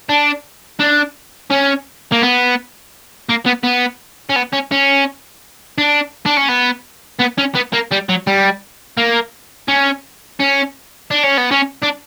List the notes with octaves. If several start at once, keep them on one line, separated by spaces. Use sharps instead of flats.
D4
D4
C#4
A#3
B3
A#3
B3
B3
C#4
B3
C#4
C#4
D4
D4
C#4
B3
B3
C#4
B3
A#3
G3
F#3
G3
A#3
C#4
C#4
D4
C#4
B3
C#4
D4